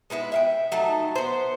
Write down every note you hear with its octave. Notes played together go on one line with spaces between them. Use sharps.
G#3 B3 E4 B4
E5 F5 G5
F#3 A3 D#4 A5
B3 C5